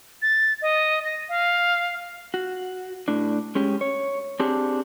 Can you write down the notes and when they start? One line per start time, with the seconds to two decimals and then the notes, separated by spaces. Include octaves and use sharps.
0.22 A6
0.62 D#5
1.05 A#6
1.29 F5
2.34 F#4
3.08 A2 D4
3.55 G#3 C#4 G4
3.81 C#5
4.40 C4 D4 G4 G#4